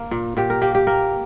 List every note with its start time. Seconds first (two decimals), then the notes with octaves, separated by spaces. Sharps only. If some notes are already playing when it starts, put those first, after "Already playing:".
Already playing: A#3
0.11 A#2
0.37 A#2 G4
0.50 A#4
0.62 A#3 G4
0.75 G4
0.87 A#3 A#4